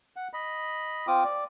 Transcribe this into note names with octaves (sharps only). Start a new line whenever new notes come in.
F#5
D#5 B5
C4 F4 D6 D#6
D5